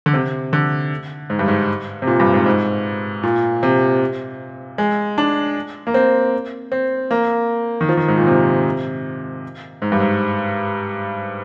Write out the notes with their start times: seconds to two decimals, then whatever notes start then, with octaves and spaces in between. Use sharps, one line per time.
0.06 D3
0.13 C3
0.53 D3
1.30 G#2
1.39 G2
1.48 G#2
2.02 C3
2.07 A#2
2.20 G2
2.34 G#2
2.46 G#2
3.23 A#2
3.63 C3
4.78 G#3
5.18 D4
5.87 A#3
5.94 C4
6.72 C4
7.11 A#3
7.81 D#3
7.89 F3
7.97 D#3
8.08 G#2
8.18 A#2
8.27 C3
9.82 G#2
9.92 G2
10.00 G#2